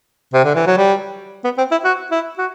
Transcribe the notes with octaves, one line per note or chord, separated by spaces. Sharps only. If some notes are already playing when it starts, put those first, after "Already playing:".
C3
D3
E3
F#3
G3
B3
C4
E4
F#4
E4
F#4